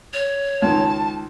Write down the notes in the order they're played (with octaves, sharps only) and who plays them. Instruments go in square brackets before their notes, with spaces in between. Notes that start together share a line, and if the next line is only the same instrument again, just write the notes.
[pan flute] C#5
[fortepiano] C#2 D#3 [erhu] A5